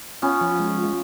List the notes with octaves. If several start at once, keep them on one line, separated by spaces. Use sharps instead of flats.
B3 C#4 F4
F3
G#3
F4